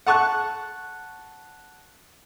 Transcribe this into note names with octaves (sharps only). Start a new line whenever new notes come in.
F#5 A5 C#6 F#6